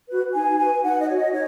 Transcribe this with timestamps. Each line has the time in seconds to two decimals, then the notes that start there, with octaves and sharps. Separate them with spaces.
0.10 F#4 B4
0.34 D#4 G#5
0.58 F#4 B4 G#5
0.83 D#4 F#5
1.00 D#5
1.08 F#4 C#5
1.16 D#5
1.32 D#4 C#5